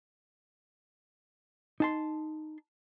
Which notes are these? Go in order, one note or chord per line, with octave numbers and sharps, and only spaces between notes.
D#4 A5 C6